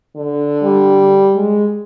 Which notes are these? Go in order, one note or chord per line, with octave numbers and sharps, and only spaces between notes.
D3
G3
G#3